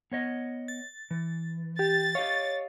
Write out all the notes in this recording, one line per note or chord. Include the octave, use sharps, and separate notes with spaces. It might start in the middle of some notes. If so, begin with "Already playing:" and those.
B3 C#5 D#5
A6
E3
G4 A6
G4 C#5 D#5 F5